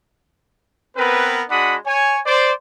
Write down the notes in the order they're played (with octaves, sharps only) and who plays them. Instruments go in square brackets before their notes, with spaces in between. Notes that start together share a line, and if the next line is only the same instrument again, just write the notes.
[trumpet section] B3 C4 A#4 B4
G#3 D4 F#4 F#5 B5 D#6
C#5 G#5
C5 D5